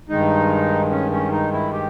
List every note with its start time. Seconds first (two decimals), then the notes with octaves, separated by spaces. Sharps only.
0.09 G2 D#3 G#3 D#4
0.91 C#4
1.11 C#4
1.31 D#4
1.53 E4
1.73 G4